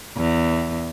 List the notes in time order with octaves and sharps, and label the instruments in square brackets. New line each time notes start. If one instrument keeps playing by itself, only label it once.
[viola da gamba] E2